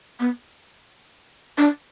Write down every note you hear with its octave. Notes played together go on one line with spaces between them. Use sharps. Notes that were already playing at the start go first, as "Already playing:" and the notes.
B3
D4